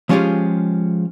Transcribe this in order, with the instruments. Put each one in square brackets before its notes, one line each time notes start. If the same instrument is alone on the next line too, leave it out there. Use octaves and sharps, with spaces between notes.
[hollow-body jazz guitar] F3 G#3 C#4 F4 G4 G#4